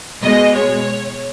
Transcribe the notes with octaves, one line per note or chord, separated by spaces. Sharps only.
B2 G#3 D#5
C#5